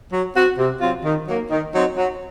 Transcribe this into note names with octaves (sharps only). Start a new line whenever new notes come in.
F#3
C4 F#4
C3
F#3 C4 F4
D#3
F#3 A#3
D#3
F#3 C4 D#4
F#3